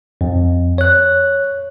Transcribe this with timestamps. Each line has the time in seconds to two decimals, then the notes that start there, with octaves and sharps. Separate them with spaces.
0.21 F2
0.78 C#5 F#6